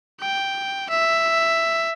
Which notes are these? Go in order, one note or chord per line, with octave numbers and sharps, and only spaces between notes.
G5
E5